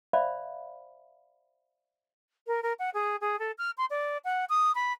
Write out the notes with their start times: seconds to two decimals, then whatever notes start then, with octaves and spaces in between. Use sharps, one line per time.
0.13 C5 D5 E5 F5 B5
2.47 A#4
2.63 A#4
2.79 F#5
2.94 G#4
3.21 G#4
3.39 A4
3.58 F6
3.78 C6
3.90 D5
4.25 F#5
4.49 D#6
4.75 B5